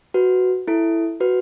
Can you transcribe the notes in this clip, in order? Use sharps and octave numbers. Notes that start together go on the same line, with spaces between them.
F#4 B4
E4 A4
F#4 B4